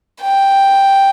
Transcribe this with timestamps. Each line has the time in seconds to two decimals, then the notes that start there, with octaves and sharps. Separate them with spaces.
0.22 G5